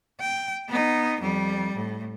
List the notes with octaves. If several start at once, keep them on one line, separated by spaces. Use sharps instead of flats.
G5
B3 D#4
F2 G3
A2